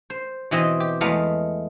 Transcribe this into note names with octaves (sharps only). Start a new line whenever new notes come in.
C5
B2 E3 C4 D#5
G4
E2 G#3 A3 B3 F5